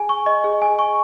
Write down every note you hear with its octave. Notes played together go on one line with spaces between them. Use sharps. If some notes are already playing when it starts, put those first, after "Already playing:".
Already playing: G#4 G#5
C#6
D#5
G#4
G#5
C#6